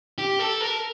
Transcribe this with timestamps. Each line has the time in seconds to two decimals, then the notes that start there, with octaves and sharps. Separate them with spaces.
0.18 G4
0.39 A4
0.61 A#4